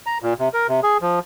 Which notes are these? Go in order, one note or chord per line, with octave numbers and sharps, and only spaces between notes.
A#5
A#2
C3
A#4
C3
G#4
F3